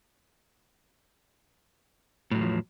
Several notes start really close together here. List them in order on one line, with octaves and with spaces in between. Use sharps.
A2 F#3 E2 F3